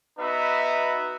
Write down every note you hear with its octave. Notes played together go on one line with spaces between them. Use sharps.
B3 D#4 F#4 B4 E5